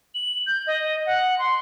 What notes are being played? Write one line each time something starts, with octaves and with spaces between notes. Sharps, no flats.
F#7
G6
D#5
F#5
C6